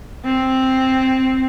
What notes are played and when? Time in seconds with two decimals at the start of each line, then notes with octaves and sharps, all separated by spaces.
0.25 C4